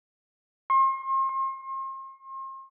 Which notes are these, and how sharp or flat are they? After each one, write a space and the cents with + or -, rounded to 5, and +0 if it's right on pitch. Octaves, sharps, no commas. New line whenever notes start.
C6 +40
C6 +40